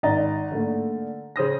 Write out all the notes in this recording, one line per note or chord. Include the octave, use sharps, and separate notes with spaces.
G#1 D5 D#5 A#5 A6
D3 A3 A#3
C#3 C5 D#6 A#6